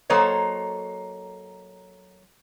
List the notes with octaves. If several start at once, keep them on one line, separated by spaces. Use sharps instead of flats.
F#3 A#3 A4 C5 C#5 D#5